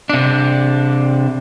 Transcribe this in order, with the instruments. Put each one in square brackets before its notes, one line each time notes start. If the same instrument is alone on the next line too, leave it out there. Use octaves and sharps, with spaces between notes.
[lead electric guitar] C3 D4